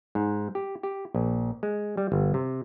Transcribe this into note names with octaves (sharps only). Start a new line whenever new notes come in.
G#2
G4
G4
A#1
G#3
G3
G1
C3